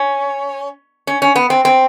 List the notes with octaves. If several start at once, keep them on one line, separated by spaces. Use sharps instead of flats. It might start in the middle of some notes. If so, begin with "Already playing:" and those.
Already playing: C#4
C#4
C#4
B3
C4
C4